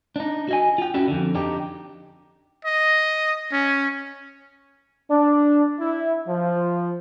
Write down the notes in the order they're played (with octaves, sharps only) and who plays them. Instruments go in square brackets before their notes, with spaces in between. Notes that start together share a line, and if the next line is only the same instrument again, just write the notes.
[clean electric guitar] D4 D#4
F#4 D#5 G#5
F4 G5
C#4 D4 E4 F#4 D5
F2 D3
D4 D#4 G4
[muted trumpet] D#5
C#4
[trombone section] D4
E4
F3